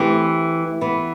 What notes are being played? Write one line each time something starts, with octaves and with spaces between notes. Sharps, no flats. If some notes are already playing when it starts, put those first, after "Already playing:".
Already playing: E3 A3 C4 G4
E3 B3